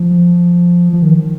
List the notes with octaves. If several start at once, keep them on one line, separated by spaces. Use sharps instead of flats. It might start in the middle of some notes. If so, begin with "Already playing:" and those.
Already playing: F3
F3
D#3